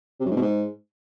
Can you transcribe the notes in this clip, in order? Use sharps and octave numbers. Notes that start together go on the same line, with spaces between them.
C3
F#2
G#2
B2
G#2